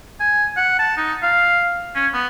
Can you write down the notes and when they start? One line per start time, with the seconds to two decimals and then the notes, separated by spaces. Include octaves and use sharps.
0.20 G#5
0.57 F#5
0.79 A5
0.97 D#4
1.23 F5
1.95 C#4
2.14 B3